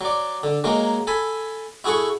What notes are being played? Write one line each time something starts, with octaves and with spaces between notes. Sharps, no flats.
F#3 D5
D3
F#3 G#3 A#3 A#4
A4 G#5 A5 B5
E4 F#4 G#4 A4 C#6